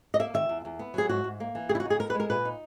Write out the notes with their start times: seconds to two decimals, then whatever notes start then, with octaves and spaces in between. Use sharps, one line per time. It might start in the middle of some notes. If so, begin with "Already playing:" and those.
0.14 D#5
0.19 A#3 E5
0.34 D#3 E5
0.49 E2
0.65 E2
0.79 B3
0.94 F#3 G#4
1.09 G#2 F#4
1.24 G#2
1.40 A#3
1.55 E3
1.69 C#3 G#4
1.75 E4
1.80 F#4
1.85 D#4
1.90 G#4
2.00 B3 A#4
2.10 B4
2.14 G#3
2.20 A#4
2.30 A#2 B4
2.45 D#4